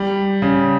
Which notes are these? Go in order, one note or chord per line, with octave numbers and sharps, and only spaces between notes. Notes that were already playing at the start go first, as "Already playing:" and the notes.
Already playing: G3
C#3